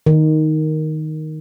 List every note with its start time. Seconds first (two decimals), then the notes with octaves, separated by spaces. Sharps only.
0.06 D#3